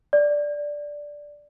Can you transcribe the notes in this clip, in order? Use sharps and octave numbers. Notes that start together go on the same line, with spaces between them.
D5